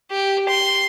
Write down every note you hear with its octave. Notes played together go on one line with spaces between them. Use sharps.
G4
C6